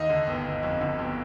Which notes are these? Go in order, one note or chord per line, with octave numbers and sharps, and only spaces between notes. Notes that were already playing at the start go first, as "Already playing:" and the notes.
Already playing: D#2 D#4 D#5
D3
G1
G1
F2
D3
G1